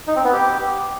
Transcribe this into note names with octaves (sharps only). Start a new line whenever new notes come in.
D#4
C4
B3
G4